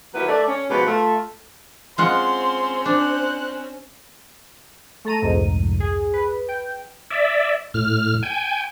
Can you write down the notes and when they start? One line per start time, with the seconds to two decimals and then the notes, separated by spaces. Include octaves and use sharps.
0.15 D#2 F#3 E4 G4 A#4 B4
0.28 A3 D5
0.48 C#4
0.70 G#2 B2 F3 G4 B4
0.86 A3 F4
1.98 G#3 C4 C#4 F4 F#5 C6
2.86 D4 C5 F#6
5.05 A3 A4 A#5 D#7
5.22 C2 F2 G#2
5.80 G#4
6.13 B4
6.48 G5
7.11 D5 E5
7.74 A2 F6
8.23 G5 G#5